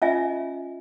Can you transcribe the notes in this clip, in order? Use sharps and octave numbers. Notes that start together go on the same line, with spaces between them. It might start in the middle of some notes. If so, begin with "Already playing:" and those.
C#4 F4 D#5 E5 G#5